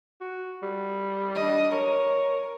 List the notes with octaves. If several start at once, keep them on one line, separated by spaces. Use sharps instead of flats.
F#4
G3
D4 D#5
A#4 C#5